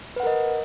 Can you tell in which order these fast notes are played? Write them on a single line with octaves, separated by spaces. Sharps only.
B4 F#5 A#4 D#5